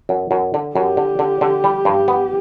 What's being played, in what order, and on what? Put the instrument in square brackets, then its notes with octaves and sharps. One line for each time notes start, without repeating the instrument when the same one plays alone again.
[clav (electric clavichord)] F#2
F#2
D3
[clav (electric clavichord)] F#2 [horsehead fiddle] G4
[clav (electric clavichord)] D3
D3
D3
G3
G2
B3